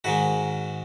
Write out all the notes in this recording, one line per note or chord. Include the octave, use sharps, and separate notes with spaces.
G#2 D#3 G#3 F#4